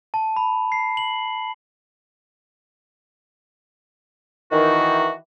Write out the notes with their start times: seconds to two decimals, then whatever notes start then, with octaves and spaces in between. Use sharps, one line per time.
0.14 A5
0.36 B5
0.72 C7
0.97 F#7
4.52 D#3 E3 F#4